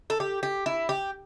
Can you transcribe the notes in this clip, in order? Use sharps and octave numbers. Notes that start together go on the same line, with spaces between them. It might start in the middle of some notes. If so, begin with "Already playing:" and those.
A4
G4
G4
E4
G4